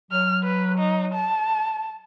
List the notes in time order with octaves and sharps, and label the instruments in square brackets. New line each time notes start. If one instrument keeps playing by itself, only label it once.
[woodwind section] F#3 [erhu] F6
[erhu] B4
D#4
A5